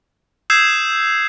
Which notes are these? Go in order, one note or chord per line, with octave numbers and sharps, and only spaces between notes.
D#6 E6 G6 G#6 C7 E7